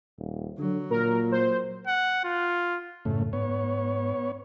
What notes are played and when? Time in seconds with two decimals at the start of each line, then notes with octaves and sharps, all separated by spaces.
0.19 D#1
0.59 D3 F#3
0.91 A#2 A#4
1.32 C5
1.87 F#5
2.24 F4
3.05 F#2 A2 C#3 A3
3.33 G#2 B3 C#5